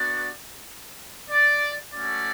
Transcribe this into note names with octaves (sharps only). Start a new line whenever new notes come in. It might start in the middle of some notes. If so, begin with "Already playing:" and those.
Already playing: B3 D4 F#4 D5
D5
A3 C#4 F#4 D5